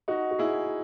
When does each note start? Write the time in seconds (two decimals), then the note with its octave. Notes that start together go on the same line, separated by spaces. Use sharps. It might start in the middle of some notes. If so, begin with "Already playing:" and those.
0.08 D#4 F#4
0.31 F#4
0.39 E4 G#4